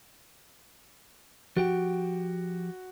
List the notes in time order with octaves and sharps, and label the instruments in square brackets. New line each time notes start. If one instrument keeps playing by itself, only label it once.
[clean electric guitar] F3 G4 G5 [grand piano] F#4